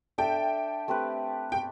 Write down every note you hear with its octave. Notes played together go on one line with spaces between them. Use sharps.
D4 A4 E5 G5
A3 C4 G4 B4
G5